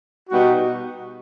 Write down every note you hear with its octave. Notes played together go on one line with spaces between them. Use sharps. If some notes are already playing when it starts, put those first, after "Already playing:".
B2 G3 B3 D#4 F#4